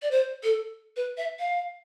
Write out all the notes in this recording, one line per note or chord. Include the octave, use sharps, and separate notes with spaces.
D5
C5
A4
B4
E5
F5